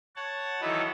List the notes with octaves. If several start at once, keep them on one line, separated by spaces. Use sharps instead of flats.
C#5 F#5 A5
D#3 E3 F#3 D#4 A4 B4